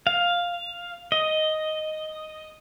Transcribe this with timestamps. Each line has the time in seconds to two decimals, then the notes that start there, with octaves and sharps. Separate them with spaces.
0.07 F5
1.12 D#5